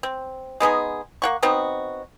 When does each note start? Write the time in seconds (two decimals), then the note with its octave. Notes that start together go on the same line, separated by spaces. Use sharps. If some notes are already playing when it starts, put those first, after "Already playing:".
0.03 C4
0.60 G#3 B3 D#4 G#4
1.22 A#3 F#5 C#6
1.43 B3 C4 D#4 F#4